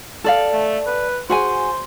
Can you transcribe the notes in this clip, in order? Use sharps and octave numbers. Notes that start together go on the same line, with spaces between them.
A4 D5 F5
A3
B4
F#4 G#4 C5 G#5